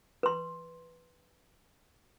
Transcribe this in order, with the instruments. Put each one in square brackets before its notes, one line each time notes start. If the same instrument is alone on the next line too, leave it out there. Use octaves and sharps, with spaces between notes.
[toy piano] B4 C6